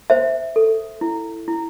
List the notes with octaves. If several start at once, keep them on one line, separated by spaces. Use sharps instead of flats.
C5 E5
A4
E4
E4